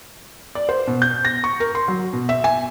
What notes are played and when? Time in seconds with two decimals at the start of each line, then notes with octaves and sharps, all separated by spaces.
0.55 D5
0.69 C5
0.87 B2
1.02 G6
1.25 A#6
1.44 C#6
1.60 A#4
1.75 C6
1.88 F#3
2.13 B2
2.29 E5
2.44 G#5